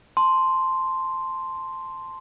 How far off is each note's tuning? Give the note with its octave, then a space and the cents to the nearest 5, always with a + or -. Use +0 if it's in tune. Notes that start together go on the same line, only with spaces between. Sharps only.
A5 -5 C6 +0